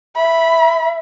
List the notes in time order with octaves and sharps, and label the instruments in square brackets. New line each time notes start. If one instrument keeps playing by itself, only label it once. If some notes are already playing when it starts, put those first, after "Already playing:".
[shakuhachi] E5 [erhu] B5